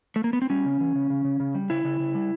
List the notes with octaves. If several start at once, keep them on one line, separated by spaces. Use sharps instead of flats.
A3
A#3
B3
C4
G3 C#4
C#3
E3
C#3
C#3
C#3
C#3
G3
C#3 E4
C#3
C#3
G3